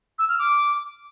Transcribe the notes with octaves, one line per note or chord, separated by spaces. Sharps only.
E6
F6
D6